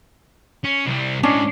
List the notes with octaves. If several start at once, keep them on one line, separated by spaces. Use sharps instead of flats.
C#4
C2 G3
A2 G#3 C#4 D4